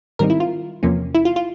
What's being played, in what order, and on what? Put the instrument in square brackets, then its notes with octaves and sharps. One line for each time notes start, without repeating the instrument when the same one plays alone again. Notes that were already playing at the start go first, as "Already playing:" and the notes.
[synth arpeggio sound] G#2 D#3 G3 C4 D#4 A#4
E4
F4
E2 C3 F3 A#3 C#4
E4
F4
F4